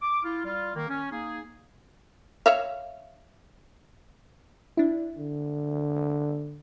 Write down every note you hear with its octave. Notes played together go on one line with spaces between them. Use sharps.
D6
E4 F4
G3 F4
D#3 A#3
C#4
A#3 D#4 G#4
C#5 E5 F5
D4 E4
D3